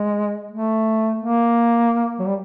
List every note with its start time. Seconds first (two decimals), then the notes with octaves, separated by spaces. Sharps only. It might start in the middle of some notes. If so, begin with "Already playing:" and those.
Already playing: G#3
0.51 A3
1.19 A#3
2.20 F#3
2.27 G3